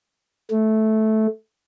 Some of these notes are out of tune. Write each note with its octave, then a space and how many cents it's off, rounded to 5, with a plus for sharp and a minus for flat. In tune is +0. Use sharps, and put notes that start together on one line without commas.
A3 -10